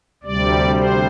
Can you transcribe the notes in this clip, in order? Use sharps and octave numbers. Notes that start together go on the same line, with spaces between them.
D2 C3 G3 D5
C5